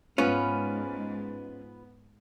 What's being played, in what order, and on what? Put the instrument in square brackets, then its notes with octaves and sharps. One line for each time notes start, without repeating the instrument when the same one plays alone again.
[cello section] G#2 [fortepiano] B3 [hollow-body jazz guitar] C#4 [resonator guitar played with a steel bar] F4 B4